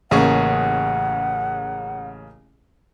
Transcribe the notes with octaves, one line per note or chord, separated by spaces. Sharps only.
A1 C#3 A#3 G#4 F#5 C#6